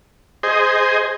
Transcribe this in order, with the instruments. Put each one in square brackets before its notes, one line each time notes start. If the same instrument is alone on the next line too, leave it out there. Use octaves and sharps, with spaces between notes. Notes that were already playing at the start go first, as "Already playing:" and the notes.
[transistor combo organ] G#4 C5 D#5